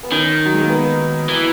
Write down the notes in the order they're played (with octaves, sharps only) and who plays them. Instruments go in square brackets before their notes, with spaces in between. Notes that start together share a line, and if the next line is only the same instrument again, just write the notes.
[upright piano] B3
[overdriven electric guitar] D#3 [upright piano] C#4
[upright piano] F#3
G#3
A#3
B3
[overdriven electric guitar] E3